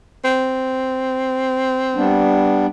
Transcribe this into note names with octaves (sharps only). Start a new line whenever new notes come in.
C4
G3 B3 D4